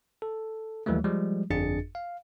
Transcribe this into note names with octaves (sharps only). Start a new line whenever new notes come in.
A4
D#2 E3 F#3 G3 A3
F3 G3 G#3
G1 F2 D4 G#4 A6 C#7
F5